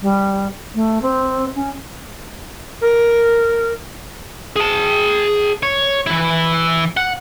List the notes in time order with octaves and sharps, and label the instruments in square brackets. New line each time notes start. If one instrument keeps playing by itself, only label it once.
[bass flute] G3
A3
C4
C#4
[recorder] A#4
[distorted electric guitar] G#4 A5
C#5
E3 E4
F#5